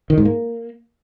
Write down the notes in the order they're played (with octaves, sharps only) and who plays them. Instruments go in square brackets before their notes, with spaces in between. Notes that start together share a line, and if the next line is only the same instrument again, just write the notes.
[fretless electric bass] D#3
G#2
A#3